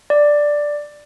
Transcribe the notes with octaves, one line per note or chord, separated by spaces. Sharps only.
D5